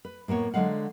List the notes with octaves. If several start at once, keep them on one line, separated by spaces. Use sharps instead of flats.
B4
A2 A#3 B3 C#5
D3 F#3 G#3 F5 F#5